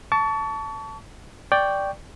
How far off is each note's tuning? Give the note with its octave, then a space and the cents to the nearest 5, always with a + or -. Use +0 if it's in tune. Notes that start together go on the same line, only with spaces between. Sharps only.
A5 +0 C#6 +35
D5 +0 G5 +0 C#6 +0